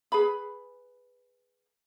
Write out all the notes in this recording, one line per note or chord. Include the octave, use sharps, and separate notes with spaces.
G#4 B4 B5